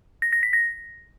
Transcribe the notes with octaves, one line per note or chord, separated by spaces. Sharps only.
A#6
A#6
B6
A#6